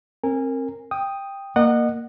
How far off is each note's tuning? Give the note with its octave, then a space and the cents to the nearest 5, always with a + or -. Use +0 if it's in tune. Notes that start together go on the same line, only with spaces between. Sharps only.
C4 +30 A#4 -15 G#5 -25
G5 +10 D#6 +0
A#3 +0 D#5 -30 F#5 +0